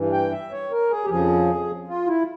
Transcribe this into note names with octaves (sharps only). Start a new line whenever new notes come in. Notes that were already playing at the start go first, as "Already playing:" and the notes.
Already playing: G2 E3
G5
E5
C#5
A#4
G#4
G4
F2 C#3 F3 G#4
F4
E4